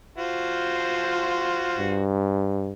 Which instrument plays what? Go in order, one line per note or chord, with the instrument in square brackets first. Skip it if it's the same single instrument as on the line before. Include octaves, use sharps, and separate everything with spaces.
[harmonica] F4 F#4 C5
[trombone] G2